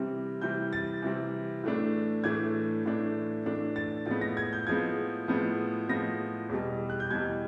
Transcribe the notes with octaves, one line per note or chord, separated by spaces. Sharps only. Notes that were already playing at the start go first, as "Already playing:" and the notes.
Already playing: C3 E3 G3 C4
C3 E3 G3 C4 G6
A6
C3 E3 G3 C4
A2 E3 A3 D4
A2 E3 A3 D4 G#6
A2 E3 A3 D4
A2 E3 A3 D4
A6
A2 F3 G#3 B3 A6
A#6
G#6
G6
A2 F3 G#3 B3 G#6
A2 F3 G#3 B3
A2 F3 G#3 B3 A#6
E2 B2 G3
F#6
G6
E2 B2 G3 G#6